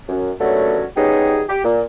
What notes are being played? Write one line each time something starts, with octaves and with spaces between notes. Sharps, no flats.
F#2
D#2 D3 F#3 A3 B3 C#4
G3 B3 C#4 D#4 G4 G#4
G4
A#2